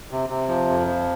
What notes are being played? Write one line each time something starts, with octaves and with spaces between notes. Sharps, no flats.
C3
C3
F3
F2
F3